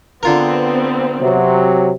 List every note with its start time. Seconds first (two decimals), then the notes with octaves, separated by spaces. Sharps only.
0.23 D3 B3 C4 F4 A#4
1.20 C3 F#3